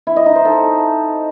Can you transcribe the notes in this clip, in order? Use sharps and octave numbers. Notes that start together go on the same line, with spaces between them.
E4
D#5
D#4
C5
A4